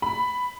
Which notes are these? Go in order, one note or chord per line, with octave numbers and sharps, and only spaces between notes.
B5